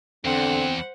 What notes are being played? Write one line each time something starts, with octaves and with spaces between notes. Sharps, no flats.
E2 D3 C4 C5 F#5